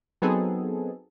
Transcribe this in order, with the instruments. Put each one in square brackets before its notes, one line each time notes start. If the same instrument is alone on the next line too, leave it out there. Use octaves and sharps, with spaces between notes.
[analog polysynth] F#3 B3 C4 D#4 G#4 A4